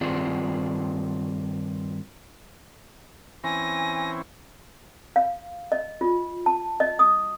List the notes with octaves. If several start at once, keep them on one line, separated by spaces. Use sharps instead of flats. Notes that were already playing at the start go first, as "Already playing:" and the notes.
G2 D#3 C4 F4 G#4 D5
E3 C4 C#4 G#5 A#6
F5
D#5
F4
A5
D#5
D#6